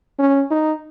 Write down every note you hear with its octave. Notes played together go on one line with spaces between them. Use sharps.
C#4
D#4